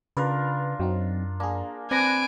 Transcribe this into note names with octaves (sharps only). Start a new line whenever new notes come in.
C#3 D4 F4 A#4 B4
F#2 F#3 C4 D#4
A#3 D4 G#4
C4 B4 D5 G#5 A5 F#6 A#6 D7